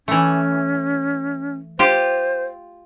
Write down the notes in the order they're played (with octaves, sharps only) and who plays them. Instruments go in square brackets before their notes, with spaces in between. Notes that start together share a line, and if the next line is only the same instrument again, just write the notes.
[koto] E3 A3 [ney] C#4
[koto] F4 G4 [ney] C5